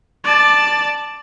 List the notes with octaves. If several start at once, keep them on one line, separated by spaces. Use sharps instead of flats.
D5 A5